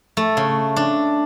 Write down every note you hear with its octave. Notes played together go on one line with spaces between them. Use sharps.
A3
C#3
D4